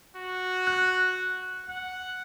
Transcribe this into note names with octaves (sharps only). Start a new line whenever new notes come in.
F#4
F#6
F#5